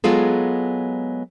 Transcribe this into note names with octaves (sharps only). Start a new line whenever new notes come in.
F#3 G#3 B3 F4 G#4 A4